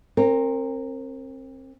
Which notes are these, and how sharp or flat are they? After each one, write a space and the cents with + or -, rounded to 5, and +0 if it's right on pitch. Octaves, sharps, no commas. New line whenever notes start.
C4 +30 A#4 -15